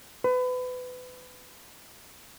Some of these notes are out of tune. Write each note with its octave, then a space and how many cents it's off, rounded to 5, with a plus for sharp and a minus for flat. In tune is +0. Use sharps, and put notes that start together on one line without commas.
B4 +30